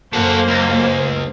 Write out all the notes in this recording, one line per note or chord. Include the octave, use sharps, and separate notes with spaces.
F#2 A3 A#3 C5 F#5
C#2